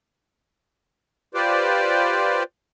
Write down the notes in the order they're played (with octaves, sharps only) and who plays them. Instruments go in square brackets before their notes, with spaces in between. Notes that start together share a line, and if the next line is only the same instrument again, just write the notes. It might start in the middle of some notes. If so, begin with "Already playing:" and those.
[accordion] F4 G4 B4 C5 D5